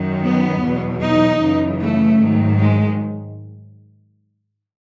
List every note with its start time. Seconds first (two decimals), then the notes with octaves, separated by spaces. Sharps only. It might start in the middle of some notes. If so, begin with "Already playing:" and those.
Already playing: F#2 D#3 F#3
0.23 B3
0.63 E2 B2 F#3
1.01 D#4
1.41 F#2 C#3 E3
1.80 A3
2.19 G#2 D#3 F#3
2.58 G#3